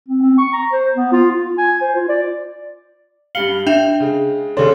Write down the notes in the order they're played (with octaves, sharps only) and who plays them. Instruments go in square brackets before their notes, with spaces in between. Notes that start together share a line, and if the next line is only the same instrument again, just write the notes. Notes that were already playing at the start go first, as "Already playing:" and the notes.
[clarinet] C4
C4
C#6
A#5
C5
B3
F4
F4
G#5
C5
F4
D5
[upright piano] G2 G3 F5 [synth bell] C#7 F#7 G7
[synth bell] D4 G5 [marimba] E5 [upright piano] G6 E7 F7
[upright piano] C#3 G#3
[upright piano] D#2 C#3 D4 [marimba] A4 C#5 C6